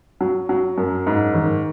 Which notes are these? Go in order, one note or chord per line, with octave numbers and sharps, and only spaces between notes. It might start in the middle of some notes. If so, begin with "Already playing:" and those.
F#3
F#3
F#2
G#2
D#3